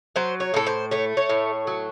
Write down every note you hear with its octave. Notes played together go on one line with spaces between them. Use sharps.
F#3 C5
C#5
A2 A4
C5
A3 C#5
C#5
A2
F#3